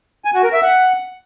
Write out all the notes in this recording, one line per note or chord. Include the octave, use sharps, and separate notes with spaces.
G#5
F#4
A#4
E5
F#5